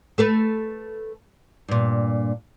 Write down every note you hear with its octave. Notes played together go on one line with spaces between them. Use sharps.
A3 A4 B4
G2 A#2